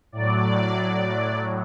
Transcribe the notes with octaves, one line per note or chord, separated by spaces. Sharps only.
A2 F#3 D5